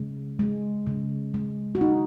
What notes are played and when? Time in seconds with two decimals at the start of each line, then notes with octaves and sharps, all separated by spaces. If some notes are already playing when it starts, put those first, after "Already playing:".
Already playing: C#3 G#3
0.39 G#3
0.87 C#3
1.34 G#3
1.75 F#4
1.81 C#3 D#4